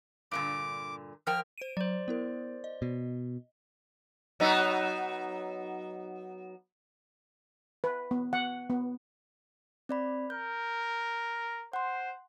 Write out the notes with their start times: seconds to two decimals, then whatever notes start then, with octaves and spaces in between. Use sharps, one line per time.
0.31 G2 A#2 D3 D6
1.27 F3 A#4 G5 F6
1.58 C5 D7 D#7
1.77 F#3 C5 D5
2.08 B3 E4 A#4
2.64 D#5
2.82 B2
4.40 F#3 B3 D#4
7.84 B4
8.11 B3
8.33 F#5
8.70 B3
9.89 C4 D5 B5
10.30 A#4 G6
11.73 C5 F#5 C6